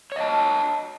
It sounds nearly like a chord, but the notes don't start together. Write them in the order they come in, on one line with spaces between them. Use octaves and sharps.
C#5 D#5 A5